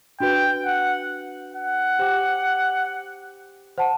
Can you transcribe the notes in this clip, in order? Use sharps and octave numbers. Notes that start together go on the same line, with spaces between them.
D4 F#4 B4 G5
F#5
F#5
G4 C5 G5 D6
C5 F#5 A5